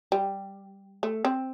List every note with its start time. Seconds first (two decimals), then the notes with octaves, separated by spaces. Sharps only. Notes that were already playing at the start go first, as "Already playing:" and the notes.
0.12 G3
1.03 A3
1.25 C4